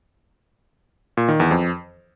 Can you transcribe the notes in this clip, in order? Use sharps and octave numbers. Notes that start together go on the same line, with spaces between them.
A#2
D#3
E2
F2